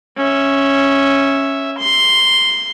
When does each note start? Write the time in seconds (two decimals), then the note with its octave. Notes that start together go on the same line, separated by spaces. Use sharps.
0.17 C#4 E5
1.78 C6